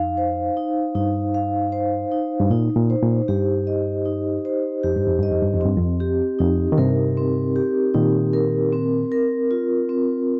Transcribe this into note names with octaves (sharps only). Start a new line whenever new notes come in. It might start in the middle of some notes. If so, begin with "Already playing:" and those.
Already playing: F2 D#4 F5
C5
D#4
G2 D#4
F5
C5
D#4
G2
A#2 D#4
A#2
C5
A#2
G2 G4
D#5
D#4
C5
F2 G4
G2
F2
G2 D#5
F2
G2
F2
G2 C4
F2
G4
F2 D#4
D#3
G2 C3 A#4
C4
G4
A#2 D#3 D#4
A#4
C4
A#4
F4
C4